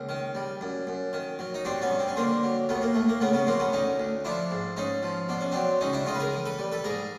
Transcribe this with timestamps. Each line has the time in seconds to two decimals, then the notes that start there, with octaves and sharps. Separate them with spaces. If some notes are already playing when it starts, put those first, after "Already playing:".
Already playing: C#2 A#3
0.09 D#3
0.35 G3
0.61 F#2
0.87 F#2
1.13 D#3
1.39 F#3
1.54 D#4
1.65 G2 C4 D4
1.82 B3 C#4
1.91 G2
1.99 C4
2.08 C#4
2.16 D3 A#3 C4
2.43 F#3
2.69 D#2 A3 B3
2.82 A#3
2.94 D#2 A3
3.09 A#3
3.21 C#3 A3 B3
3.33 B3 C#4
3.47 F#3 A#3 C4
3.60 B3 C#4
3.72 D2 C#4 D#4
4.00 D2
4.25 F3 D4 E4
4.51 G#2
4.77 G#2 C#4 D#4
5.03 F3
5.29 B2 D4
5.41 C#4
5.52 F#3 C4 D4
5.81 C#2 C#4 D#4
5.93 D4 E4
6.06 C#2 D#4 F4
6.15 B4
6.20 G#4 A#4
6.33 E3
6.45 A4 B4
6.59 G3
6.72 A4 B4
6.84 G#2 G#4 A#4